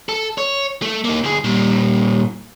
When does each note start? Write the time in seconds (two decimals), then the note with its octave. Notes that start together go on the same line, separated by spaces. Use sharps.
0.09 A4
0.38 C#5
0.82 A3
1.05 A#3 D#4
1.24 D2 G#4
1.44 A#2 G3